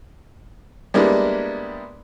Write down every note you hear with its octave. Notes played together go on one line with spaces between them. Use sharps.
G3 G#3 A#3 B3 D4 E4